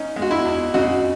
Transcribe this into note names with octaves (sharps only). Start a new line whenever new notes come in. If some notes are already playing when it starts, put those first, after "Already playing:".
Already playing: C#4 D#4
G#3
F#4
E4
E2
C#3 D#4 F#4